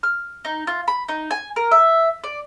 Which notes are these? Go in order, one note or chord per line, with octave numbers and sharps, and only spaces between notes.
F6
D#4
F4
B5
D#4
G#5
A#4
E5
D5